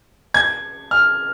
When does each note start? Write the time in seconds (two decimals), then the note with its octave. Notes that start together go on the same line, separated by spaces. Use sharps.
0.34 G#6
0.91 F6